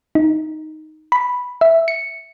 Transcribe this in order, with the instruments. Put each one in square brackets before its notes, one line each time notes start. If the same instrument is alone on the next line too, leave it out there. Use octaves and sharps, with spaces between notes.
[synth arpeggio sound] D#4
B5
E5
C#7